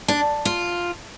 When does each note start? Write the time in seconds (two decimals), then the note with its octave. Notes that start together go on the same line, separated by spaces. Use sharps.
0.08 D4
0.45 F4